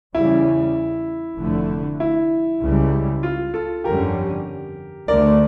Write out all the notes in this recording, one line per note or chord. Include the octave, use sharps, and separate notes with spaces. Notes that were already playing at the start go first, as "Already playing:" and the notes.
E2 C#3 G3 E4
F1 F2 D3 A3
E4
C#2 C#3 G3
F4
F4 A4
G1 F2 D3 G3 C#4 G4 A#4
D2 D3 A3 A#4 D5